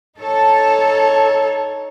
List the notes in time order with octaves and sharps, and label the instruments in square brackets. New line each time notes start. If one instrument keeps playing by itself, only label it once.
[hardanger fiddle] D#4 C#5 [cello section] A4